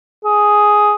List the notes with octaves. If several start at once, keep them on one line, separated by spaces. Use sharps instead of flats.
G#4